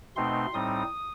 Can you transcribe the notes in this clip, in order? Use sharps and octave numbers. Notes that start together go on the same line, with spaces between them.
B2 A3 C4 D#4 C6
A2 G3 C4 D#4 D#6